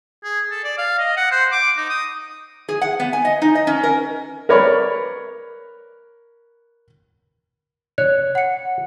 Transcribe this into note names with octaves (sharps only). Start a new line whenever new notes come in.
G#4
A4
D5
F5
D#5
F#5
C5
D6
D#4
D#6
G#4
F#5
B3
G#5
D#5
D#4
D#5
C#4
A#4
A#4 B4 C#5 D5 B5
C#5 F#6
F#5 C#7